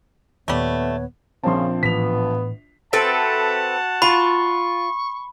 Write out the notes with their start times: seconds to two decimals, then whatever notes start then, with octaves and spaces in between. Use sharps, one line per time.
0.48 D#2 A#2 G3 A3 B3 C#5
1.43 A#1 C#3 C4 F4 A5 C6
1.83 A2 E3 B3 B6 F7
2.93 C4 F#4 A4 B4 E5 F#5 A5
4.02 F4 B5 C#6